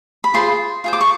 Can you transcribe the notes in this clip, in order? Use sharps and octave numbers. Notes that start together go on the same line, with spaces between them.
B5
F4 G#4 C5 C6
F4 G#4 C5
D6
C#6